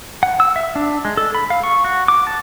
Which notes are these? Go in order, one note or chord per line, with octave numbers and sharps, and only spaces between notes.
F#5
E6
E5
D4
G#3
A4
B5
F5
C#6
F#4
D6
A5